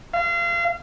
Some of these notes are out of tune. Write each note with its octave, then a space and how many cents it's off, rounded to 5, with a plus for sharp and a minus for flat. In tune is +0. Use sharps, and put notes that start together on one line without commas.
F5 -35